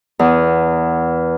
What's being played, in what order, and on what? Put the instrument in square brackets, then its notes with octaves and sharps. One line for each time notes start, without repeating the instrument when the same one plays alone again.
[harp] E2